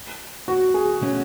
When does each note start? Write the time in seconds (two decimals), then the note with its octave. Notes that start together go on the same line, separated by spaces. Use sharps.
0.48 F#4
0.74 G#4
1.01 B2 A3 C#4 F#4